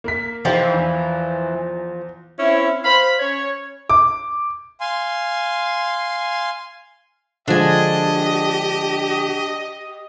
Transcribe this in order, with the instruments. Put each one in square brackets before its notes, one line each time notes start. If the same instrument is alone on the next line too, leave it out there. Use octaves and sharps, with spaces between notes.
[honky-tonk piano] A#3 A#4 B6
[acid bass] E3 [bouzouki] F3 [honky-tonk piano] D#4 G4 C5
[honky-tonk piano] E2
[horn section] C4 C#4 E4
C5 F5 B5
C#4 C#5
[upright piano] D6
[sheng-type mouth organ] F5 G#5 C6
[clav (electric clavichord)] D3 F3 G#3 [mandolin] D4 G#5 [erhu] G4 [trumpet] D#5